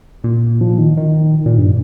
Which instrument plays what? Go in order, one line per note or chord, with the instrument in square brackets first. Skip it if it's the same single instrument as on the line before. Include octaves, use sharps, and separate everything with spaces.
[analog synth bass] A#2
F3
D#3
D#3
A#2
G2